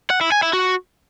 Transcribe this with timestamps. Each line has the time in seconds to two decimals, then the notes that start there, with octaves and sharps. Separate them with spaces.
0.10 F#5
0.21 E4
0.32 G#5
0.43 E4
0.53 F#4